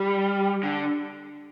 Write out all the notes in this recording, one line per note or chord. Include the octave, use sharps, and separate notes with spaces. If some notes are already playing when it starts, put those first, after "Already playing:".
Already playing: G3
D3